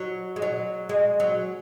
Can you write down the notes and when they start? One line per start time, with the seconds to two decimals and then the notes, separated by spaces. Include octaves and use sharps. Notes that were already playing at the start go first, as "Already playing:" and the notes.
Already playing: F#3
0.36 G#3
0.42 F#3
0.89 G#3
1.20 F#3